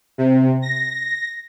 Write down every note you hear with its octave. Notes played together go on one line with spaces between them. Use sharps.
C3
A#6